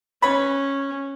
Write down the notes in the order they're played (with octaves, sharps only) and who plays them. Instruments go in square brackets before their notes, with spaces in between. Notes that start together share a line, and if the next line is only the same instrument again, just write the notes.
[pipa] G3 B4 C#5 [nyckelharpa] C#4 [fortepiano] B5